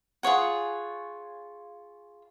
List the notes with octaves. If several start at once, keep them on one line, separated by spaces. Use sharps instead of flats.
F4 G#4 C#5 F#5